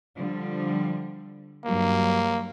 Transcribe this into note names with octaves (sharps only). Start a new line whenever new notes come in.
D3 F3 G3
G2 F#3 G3 A#3